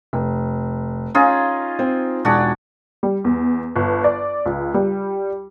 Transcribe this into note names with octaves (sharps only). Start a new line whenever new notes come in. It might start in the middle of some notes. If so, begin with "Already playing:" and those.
F1
C#4 D#4 F4 G#4
C4
E1 D4 F#4 G#4
G3
E2
G1
D5
C#2
G3